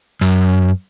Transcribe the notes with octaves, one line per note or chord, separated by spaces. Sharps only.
F#2